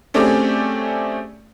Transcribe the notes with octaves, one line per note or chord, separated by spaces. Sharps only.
A3 C4 C#4 G4 G#4 D5